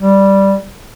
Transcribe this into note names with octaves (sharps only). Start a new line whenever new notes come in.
G3